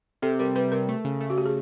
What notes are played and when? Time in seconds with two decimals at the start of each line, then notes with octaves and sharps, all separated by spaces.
0.22 C3 A4
0.39 G3 A#4
0.56 G3 B4
0.72 C3 A#4
0.89 A3
1.05 C#3
1.21 A3
1.30 F#4
1.38 G4
1.46 G#4